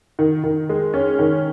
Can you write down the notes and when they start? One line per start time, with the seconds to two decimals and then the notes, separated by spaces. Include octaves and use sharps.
0.19 D#3
0.44 D#3
0.69 G#3
0.94 C#4
1.19 D#3